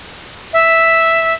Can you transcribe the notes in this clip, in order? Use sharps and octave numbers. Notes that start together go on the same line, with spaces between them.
E5